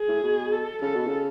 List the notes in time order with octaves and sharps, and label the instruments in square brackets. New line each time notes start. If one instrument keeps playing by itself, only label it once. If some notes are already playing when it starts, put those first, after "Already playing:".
Already playing: [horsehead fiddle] G#4
[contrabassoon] A2
B2
[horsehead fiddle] A4
[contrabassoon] C#3 [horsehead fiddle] A4
[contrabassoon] B2
C#3